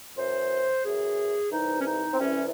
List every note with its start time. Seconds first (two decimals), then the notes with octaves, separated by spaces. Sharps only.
0.16 F#2 E3 C5
0.83 F#2 E3 G#4
1.51 C2 C3 E3 D#4
1.79 C#4
1.85 D#4
2.13 C4
2.19 C2 C3 E3 C#4